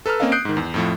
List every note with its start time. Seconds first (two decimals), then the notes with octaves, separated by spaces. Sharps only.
0.06 A4 B4 A#5 E6 F6
0.20 A#3 C4 C#4 A#4 D#5 F5
0.32 D#6 F#6 G6 C7 D7
0.45 G#2 D#3
0.57 E2
0.74 F2 A2 F3